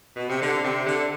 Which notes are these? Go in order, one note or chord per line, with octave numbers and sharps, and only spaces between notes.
B2
C3
D3
C3
D3